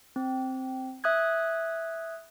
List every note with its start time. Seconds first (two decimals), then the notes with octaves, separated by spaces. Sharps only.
0.16 C4
1.04 E5 D#6 F#6 G#6